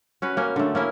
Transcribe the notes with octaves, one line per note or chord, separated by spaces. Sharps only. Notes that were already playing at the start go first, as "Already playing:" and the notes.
C#4 F#4 B4
A#3 C#4
D3 A3
A#3 C#4 E4